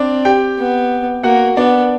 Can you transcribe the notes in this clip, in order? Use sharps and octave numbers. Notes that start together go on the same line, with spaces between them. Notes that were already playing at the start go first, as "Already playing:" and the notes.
Already playing: C4 D4 D5
G4 G5
B3
A#3 F#4 F#5
B3 D4 D5